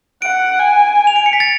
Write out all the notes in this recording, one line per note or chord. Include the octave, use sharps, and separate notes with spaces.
F#5 D7
G#5
F7
D7
C#7
B6
A6